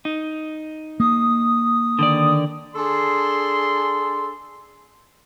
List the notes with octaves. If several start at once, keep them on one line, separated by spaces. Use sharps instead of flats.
D#4
A#3 D#6
D3 D#3 D5
D4 G#4 A4 C6